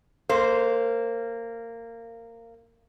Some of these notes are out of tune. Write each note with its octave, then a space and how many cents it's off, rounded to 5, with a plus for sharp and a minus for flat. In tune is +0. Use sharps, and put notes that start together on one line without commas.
A#3 -20 C5 +0